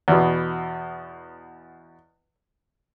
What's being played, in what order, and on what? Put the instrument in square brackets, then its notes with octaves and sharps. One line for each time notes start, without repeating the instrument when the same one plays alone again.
[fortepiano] E2 B2